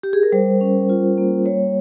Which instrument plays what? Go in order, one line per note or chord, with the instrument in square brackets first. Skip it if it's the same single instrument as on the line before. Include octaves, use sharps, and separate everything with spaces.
[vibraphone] G4
G#4
A#4
G3 C5
C#4
F4
A#3
G3 C#5